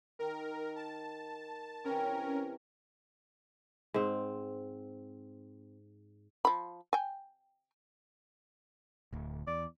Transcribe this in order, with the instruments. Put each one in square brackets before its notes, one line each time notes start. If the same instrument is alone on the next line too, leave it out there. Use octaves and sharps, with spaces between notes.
[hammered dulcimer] D#3 [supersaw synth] A#4
[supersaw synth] A5
[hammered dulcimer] C3 E3 [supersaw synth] C#4 A#4
[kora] G#2 C4
[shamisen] F3 B5
G5 G#5
[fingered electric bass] D1 D2
[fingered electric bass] E2 [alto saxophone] D5